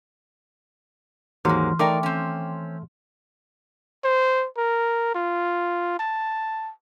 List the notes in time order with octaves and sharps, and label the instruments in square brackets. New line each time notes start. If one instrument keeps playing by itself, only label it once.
[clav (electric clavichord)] D#2 G#2 F#3 [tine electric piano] E3 C6 F6 [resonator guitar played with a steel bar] G#3 A#3
[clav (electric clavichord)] A3 [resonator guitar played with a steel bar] D#4 A#4 D5 [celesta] G5 D6
[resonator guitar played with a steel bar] C4 C#4
[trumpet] C5
A#4
F4
A5